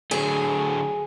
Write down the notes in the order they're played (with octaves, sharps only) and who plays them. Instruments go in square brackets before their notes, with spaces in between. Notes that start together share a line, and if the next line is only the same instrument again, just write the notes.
[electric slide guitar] D3 F#3 A3 [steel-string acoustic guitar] G#4